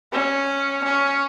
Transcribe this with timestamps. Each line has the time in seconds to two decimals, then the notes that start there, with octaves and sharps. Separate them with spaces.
0.13 C#4
0.84 C#4